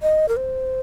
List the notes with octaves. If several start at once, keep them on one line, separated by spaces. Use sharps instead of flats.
D#5
A#4
C5